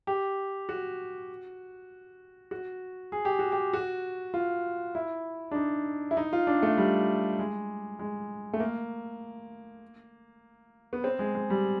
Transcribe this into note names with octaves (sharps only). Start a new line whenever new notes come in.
G4
F#4
F#4
G#4
G4
F#4
G4
F#4
F4
E4
D4
D#4
E4
D#4
F4
D4
A3
G3
G#3
G#3
A3
A#3
B3
C4
G#3
G#3
G3